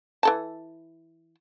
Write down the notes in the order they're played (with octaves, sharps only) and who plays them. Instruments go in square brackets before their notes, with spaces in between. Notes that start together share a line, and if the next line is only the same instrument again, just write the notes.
[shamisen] E3 A4 A5